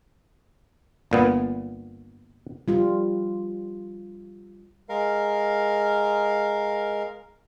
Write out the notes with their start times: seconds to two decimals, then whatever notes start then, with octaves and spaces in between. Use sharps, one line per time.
1.11 G1 A#2 B3
2.68 G3 F4
4.89 G#3 A#4 F5